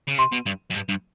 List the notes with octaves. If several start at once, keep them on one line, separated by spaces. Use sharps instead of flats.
C#3
C3 C6
B2
G2
F#2
G2
G2